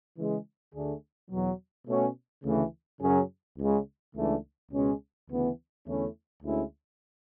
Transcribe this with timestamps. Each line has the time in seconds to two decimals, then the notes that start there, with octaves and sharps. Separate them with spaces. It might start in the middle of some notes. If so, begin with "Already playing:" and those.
0.17 C#3 E3 G#3
0.74 D2 D3 A3 D4 G#4
1.31 E2 B2 F#3
1.87 B2 A3 C#4 F#4
2.45 D2 C#3 E3 A3
3.01 F#2 C#3 F#3 C#4 G#4
3.58 C#2 C#3 G#3
4.15 C#2 C#3 E3 A3 D4
4.72 C#2 B2 G#3 C#4
5.30 D2 C#3 E3 B3
5.86 E2 D3 A3 C#4 E4
6.43 D2 D3 G#3 C#4 E4